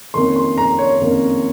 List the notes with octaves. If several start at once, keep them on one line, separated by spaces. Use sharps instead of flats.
F2 D#3 A#3 C#4 C6
C6
A#5
C#5
F2 D#3 A#3 C#4